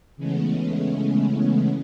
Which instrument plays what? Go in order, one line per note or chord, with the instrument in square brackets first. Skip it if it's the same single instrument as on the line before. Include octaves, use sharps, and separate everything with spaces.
[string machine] C#3 E3 G#3 A3 B3 C#4